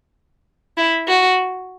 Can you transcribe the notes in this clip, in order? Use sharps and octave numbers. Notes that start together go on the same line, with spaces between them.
E4
F#4